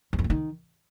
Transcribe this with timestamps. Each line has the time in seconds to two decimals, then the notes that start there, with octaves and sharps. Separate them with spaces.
0.13 E2
0.19 F2
0.24 A2
0.30 D#3